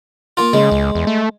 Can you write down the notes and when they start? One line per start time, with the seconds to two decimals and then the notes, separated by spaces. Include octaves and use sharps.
0.37 A#3 F4
0.53 C#3 G#3
0.71 C#2
0.95 E2
1.07 A3